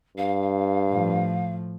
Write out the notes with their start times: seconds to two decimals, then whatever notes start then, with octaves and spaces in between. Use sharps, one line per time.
0.17 G2 F5
0.89 A2 F3